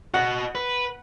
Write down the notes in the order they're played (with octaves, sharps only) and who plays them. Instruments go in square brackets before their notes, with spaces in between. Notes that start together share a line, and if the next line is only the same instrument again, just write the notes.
[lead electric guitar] F#4 D#5 [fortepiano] F#5
[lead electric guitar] B4